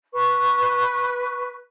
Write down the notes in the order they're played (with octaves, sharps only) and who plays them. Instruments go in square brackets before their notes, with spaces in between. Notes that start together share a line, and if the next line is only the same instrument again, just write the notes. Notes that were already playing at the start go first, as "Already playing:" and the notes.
[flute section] B4 C#6